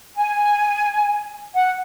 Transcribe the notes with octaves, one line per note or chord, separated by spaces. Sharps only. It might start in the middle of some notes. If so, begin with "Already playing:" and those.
G#5
F#5